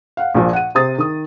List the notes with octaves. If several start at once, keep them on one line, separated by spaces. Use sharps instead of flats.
F5 F#5
A#1 A#2 F3
F#5 D#7
C3 C5 D#6 A6
D#3 D#6